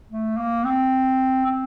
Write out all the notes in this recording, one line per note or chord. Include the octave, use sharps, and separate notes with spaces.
A3
A#3
C4
C4